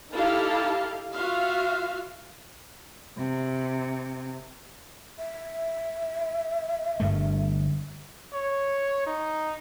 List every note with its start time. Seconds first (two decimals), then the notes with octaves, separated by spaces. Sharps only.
0.14 D#4 E4 G4 A4 F5 A5
1.15 F4 F#4 E5 F5
3.16 C3
5.19 E5
7.00 G1 G2 A3
8.33 C#5
9.06 D#4